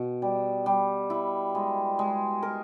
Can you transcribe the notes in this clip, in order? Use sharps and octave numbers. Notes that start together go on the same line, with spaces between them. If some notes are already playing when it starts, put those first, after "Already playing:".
Already playing: B2
G3
G3
E4
G#3
G#3
A#4